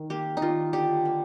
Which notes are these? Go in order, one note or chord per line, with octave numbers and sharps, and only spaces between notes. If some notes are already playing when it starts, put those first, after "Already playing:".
Already playing: D#3
A#3 G4
D#4
D#3 F4
D3 G4
A#3